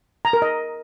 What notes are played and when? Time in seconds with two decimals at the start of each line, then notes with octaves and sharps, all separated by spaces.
0.25 A#5
0.33 A#4
0.42 D#5